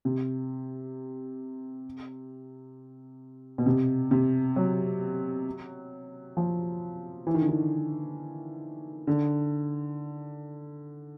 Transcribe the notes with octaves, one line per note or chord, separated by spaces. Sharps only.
C3
B2
C3
C3
F#3
F3
E3
D#3
D3
D#3
D3